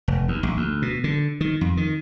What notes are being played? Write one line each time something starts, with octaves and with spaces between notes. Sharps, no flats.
F1
D#2
A#1
D2
B2
D3
D#3
F2
D#3